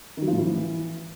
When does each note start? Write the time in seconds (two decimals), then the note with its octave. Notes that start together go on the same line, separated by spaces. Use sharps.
0.17 D#3
0.22 F#3
0.27 F3
0.32 A2
0.38 E3